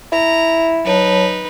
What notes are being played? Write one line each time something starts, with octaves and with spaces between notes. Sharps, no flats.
E4 A#5
F#3 D#4 B4 C#5 A5